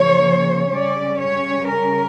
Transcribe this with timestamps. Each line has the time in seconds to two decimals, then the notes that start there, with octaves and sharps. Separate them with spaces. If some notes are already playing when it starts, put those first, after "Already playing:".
Already playing: C#3 F3 A#3 C#5
0.73 C#3 G3 C#4 D5
1.20 C#5
1.67 A#4